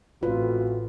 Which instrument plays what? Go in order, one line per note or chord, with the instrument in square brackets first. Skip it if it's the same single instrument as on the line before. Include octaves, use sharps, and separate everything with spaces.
[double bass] A1 [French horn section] A3 C4 F#4 [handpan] F4 [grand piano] B4